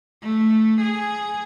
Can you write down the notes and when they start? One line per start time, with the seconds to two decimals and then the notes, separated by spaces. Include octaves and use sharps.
0.22 A3
0.81 G#4